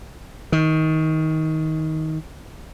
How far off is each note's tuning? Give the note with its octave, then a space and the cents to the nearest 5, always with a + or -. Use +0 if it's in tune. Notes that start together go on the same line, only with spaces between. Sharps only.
D#3 +20